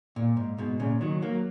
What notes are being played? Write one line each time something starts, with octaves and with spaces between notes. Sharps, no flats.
A#2
G#2
G#2 B2
A#2 C#3
D#3 F#3
F#3 A#3